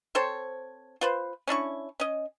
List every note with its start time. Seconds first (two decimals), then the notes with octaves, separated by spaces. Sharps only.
0.15 C4 A4 C5 C#5
1.01 F4 B4 C5
1.48 C#4 D4 E4 C#6
2.00 C#4 D#5